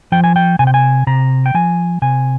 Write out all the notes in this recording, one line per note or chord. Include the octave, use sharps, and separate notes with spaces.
F3 G5
G#5
G5
C3 G#5
G5
G#5
C3 A#5
G5
F3 G#5
C3 G#5